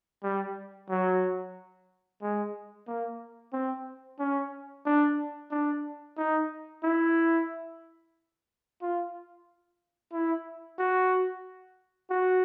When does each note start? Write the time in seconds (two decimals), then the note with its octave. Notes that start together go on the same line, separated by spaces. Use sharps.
0.23 G3
0.90 F#3
2.22 G#3
2.87 A#3
3.53 C4
4.19 C#4
4.86 D4
5.51 D4
6.17 D#4
6.83 E4
8.82 F4
10.12 E4
10.79 F#4
12.10 F#4